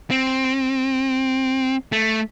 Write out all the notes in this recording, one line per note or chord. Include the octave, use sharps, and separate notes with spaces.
C4
A3